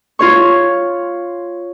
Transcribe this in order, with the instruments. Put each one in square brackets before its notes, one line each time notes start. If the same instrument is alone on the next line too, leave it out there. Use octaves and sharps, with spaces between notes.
[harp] F4 C#5 C#6